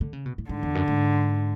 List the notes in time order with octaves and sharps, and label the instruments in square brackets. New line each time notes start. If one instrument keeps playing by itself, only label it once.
[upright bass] D3
C#3
B2
A2
[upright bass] G#2 [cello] D3
[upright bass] E2
F#2
G#2